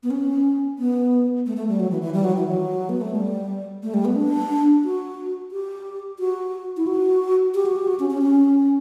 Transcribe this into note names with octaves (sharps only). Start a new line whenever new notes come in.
B3
C#4
B3
A3
A3
G3
F#3
E3
E3
G3
F#3
E3
F#3
B3
A3
G3
A3
G3
B3
D4
F#4
G4
F#4
E4
F#4
G4
F#4
G4
F#4
C#4
C#4
C#4